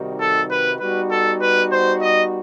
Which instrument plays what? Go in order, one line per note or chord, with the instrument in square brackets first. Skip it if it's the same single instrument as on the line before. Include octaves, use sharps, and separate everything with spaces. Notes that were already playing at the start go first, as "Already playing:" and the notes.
Already playing: [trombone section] C3 D#3 G3 D#4 F#4
[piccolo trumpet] A4
B4
[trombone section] G3 B3 D#4 F#4 [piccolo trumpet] B4
[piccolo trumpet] A4
B4
C5
D#5